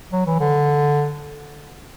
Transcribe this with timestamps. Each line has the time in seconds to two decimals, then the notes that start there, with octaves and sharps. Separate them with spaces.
0.12 F#3
0.26 E3
0.40 D3